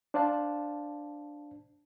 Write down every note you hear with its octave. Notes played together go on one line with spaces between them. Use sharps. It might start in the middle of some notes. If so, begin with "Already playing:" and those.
D4 C5 D5 F5 A5